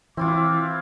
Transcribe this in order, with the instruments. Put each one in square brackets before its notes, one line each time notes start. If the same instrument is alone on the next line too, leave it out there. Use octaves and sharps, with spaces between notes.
[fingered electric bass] E3 [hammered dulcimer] C4 E4 F4 [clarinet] D6